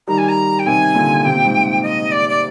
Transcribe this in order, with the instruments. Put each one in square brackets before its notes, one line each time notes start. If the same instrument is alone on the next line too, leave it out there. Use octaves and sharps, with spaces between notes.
[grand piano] D#3 G3 [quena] A#5
[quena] G#5
A#5
G5
[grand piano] C3 D#3 [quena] G#5
[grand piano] A#2 D3
[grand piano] C3 [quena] G5
[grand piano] A#2
G#2 C3
[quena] D#5
D5
D5